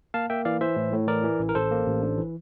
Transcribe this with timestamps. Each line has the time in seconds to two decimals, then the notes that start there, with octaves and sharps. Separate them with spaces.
0.14 A#3 F5 A5
0.30 A#3 E5 G5
0.45 E3 D5 F5
0.61 E3 C5 E5
0.76 A2
0.93 A2
1.08 E3 A#4 D5
1.24 E3
1.39 A1
1.49 A#4
1.55 A1 A4 C5
1.71 A#3
1.86 A1
2.02 D4
2.18 E3